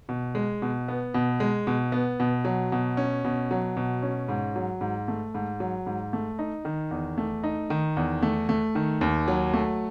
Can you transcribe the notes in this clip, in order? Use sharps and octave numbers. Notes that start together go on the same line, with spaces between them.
B2
G#3
B2
B3
B2
G#3
B2
B3
B2
F#3
B2
C#4
B2
F#3
B2
C#4
G#2
F#3
G#2
A3
G#2
F#3
G#2
A3
D#4
D#3
E2
A3
D#4
D#3
E2
A3
A3
D#3
D#2
F#3
A3